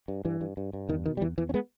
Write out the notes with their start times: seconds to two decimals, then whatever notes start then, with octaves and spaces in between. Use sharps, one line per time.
0.08 G2
0.25 G2 E3
0.41 G2
0.57 G2
0.73 G2
0.89 E2 D#3
1.05 B2 D#3
1.17 G3
1.21 E2 E3
1.38 E2 E3
1.49 C#4
1.54 G#3 B3